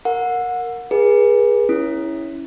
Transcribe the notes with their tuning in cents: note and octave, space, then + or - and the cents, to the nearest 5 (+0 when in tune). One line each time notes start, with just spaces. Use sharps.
A#4 +0 F#5 -30
G#4 -15 B4 -40
C#4 +0 E4 -10